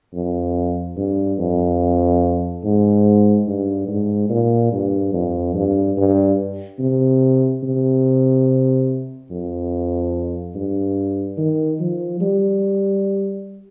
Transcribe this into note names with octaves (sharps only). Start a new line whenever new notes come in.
F2
G2
F2
G#2
G2
G#2
A#2
G2
F2
G2
G2
C3
C3
F2
G2
D#3
F3
G3